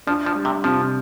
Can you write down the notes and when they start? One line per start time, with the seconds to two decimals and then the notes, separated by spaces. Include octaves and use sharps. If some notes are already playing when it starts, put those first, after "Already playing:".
0.07 F3 D4
0.26 F3
0.35 G3
0.45 C3
0.64 C3 F3